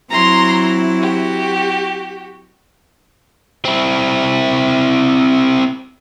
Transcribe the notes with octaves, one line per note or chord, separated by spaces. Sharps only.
F#3 C4 E4 A#5 C6
F#4 G4
C4 E4